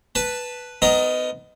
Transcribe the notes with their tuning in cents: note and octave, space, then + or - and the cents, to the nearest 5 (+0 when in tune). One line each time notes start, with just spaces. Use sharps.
B4 +0 A5 +0
B3 +35 D#4 +0 A#4 +0